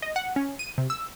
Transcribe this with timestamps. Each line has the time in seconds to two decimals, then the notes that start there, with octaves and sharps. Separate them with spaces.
0.02 D#5
0.16 F#5
0.36 C#4
0.59 D#7
0.78 C3
0.90 E6